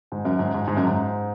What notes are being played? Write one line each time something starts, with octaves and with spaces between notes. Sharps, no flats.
G#2
F#2
G#2
G#2
G#2
F#2
G#2